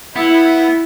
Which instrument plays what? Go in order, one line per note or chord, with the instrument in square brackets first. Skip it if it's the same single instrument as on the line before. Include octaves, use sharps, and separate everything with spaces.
[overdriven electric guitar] B3 [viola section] E4